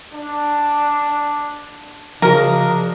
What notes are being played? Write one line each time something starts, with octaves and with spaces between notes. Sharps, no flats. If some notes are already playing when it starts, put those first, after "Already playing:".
D4
C#3 F3 D4 F#4 A#4 D#5